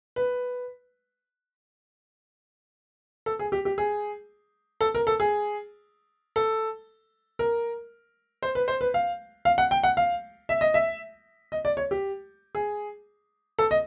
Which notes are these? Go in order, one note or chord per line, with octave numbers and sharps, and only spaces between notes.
B4
A4
G#4
G4
G4
G#4
A4
A#4
A4
G#4
A4
A#4
C5
B4
C5
B4
F5
F5
F#5
G5
F#5
F5
E5
D#5
E5
D#5
D5
C#5
G4
G#4
A4
D#5